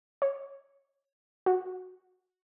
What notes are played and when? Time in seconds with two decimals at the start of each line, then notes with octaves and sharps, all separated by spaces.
0.22 C#5
1.46 F#4